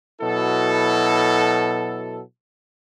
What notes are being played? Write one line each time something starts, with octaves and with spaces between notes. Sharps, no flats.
B2 F#3 E4 A4